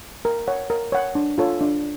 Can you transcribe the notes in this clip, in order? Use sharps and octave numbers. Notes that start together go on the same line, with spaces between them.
A#4
C#5 F#5
A#4
C#5 F#5
D4
F4 A4 C#5
D4